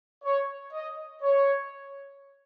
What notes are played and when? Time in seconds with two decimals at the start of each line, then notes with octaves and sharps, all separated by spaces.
0.24 C#5
0.73 D#5
1.22 C#5